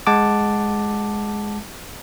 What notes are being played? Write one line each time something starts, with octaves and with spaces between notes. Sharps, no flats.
G#3 F#5 A5 D6